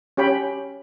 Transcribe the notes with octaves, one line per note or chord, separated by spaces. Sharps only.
C#4 G4 C#5 G5 B5